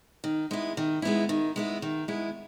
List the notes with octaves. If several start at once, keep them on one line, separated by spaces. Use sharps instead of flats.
D#3
G#3 B3 E4
D#3
G#3 B3 E4
D#3
G#3 B3 E4
D#3
G#3 B3 E4